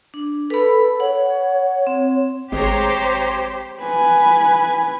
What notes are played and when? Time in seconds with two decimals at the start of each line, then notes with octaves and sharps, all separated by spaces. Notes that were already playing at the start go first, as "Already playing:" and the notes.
0.14 D4
0.50 A4 B4 B5
1.00 C#5 F#5
1.87 C4
2.52 G#1 G#3 C4 G4 C5 C#5 A#5 C6
3.81 B4 G#5